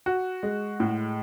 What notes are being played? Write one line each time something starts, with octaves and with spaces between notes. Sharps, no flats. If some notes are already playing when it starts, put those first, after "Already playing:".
F#4
G#3
A2